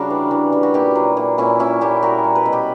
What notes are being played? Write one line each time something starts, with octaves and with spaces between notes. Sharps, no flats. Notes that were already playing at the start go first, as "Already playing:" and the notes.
Already playing: C#3 G3 D4 F#4 A#4
E3
E3
G3
F#4
A#2 E4 G4
F#3
A#2
A#2 C#4 E4
A#2 C#4 E4
A#2 E4 G4
G3 F#4 A#4
G3
B4
B2
G4 B4